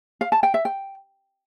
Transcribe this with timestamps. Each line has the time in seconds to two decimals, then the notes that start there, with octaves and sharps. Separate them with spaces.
0.21 F5
0.32 A5
0.43 G5
0.54 E5
0.65 G5